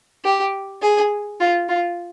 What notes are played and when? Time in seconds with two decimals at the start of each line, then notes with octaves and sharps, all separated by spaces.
0.24 G4
0.82 G#4
1.40 F4
1.69 F4